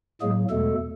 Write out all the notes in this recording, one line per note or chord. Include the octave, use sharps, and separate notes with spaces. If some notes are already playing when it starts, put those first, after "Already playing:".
A2 F#3 G#3 A#3 G#4
E2 B2 G#3 A3 A4